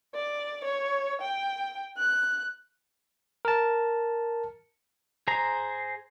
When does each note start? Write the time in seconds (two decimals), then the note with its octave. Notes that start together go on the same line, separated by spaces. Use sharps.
0.14 D5
0.64 C#5
1.21 G5
1.98 F#6
3.45 A#4 A5
5.28 G#4 C5 A#5